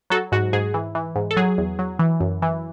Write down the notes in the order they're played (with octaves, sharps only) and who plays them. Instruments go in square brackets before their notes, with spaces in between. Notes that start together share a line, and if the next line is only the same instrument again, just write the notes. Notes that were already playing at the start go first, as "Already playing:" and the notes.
[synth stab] F#3 F#4 A4
G#2 F#4
G#2 G#4
E3
E3
G#2
A4
F#3 G#4
E2
F#3
E3
F#2
E3